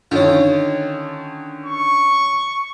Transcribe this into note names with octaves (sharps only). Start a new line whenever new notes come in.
D3 D#3 C#4 F4
C#6